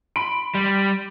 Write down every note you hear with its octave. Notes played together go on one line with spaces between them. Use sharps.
B5 C6 D7
G3